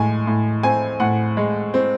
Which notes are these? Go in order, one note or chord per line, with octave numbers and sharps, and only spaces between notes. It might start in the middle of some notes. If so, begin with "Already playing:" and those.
Already playing: A2 G#3 G#5
A2
C4 G#5
A2 F#5
G#3
C4